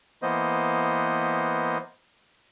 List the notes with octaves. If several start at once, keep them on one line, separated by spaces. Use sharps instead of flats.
E3 A#3 B3 C5 D#5